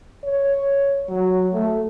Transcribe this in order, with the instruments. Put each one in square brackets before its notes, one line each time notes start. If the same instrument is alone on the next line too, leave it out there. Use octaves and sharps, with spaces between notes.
[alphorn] C#5
F#3
A3